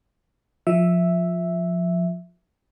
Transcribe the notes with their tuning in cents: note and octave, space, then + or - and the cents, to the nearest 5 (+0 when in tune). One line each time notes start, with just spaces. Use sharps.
F3 +15 E5 +0